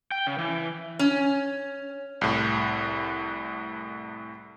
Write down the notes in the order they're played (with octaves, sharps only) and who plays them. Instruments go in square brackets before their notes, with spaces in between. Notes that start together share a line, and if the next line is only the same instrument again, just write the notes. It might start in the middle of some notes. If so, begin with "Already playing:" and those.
[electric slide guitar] G5
C#3
E3
[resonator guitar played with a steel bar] C#4
[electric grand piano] C2 A2